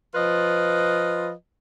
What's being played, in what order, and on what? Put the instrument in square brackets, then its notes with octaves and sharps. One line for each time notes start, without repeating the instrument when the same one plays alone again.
[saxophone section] F3 F4 B4 D#5